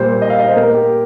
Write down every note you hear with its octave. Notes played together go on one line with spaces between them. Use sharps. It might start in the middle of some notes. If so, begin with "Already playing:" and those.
Already playing: A#2 G3 A#3 C5
D#5
F5
D#5
C5
A#2 A#3 A#4
G4